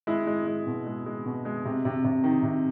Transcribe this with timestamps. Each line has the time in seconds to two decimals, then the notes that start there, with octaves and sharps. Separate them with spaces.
0.07 G#3 E4
0.27 G#3
0.47 G#3
0.66 B2
0.86 G#3
1.06 G#3
1.26 B2
1.45 G#3
1.65 C3
1.85 C3
2.04 C3
2.23 D#3
2.43 C3